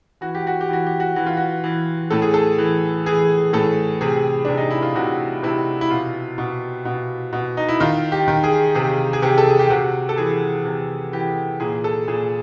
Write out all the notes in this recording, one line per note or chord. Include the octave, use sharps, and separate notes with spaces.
E3 F#4
G4
F#4
G4
E3 F#4
G4
F#4
E3 F#4
F4
F#4
E3
A2 A4
G#4
A4
E3
E3 G#4
A2 A4
C3 G#4
C3 D4
D#4
E4
F4
C3 F#4
C3 E4
E4
B2 F4
B2
B2
B2
D#4
E4
D#3 F4
G4
D#3
G#4
C3 G#4
G#4
C3 G4
A4
G#4
G4
C3 F#4
A4
E3 G#4
C3
E3 G4
A#2 G#4
A4
A#2 G#4